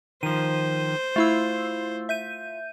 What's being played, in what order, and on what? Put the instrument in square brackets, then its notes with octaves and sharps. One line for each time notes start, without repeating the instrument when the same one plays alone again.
[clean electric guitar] D#3 F3 [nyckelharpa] C5 [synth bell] D#7
[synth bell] A3 E4 E6 [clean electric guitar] F4
[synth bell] E5 G6 D#7